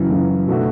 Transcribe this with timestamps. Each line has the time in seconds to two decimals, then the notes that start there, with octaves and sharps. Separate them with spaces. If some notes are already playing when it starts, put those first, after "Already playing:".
Already playing: F#2 C#3 E3
0.11 F#2 C#3 E3
0.48 B2 A3 D4 F#4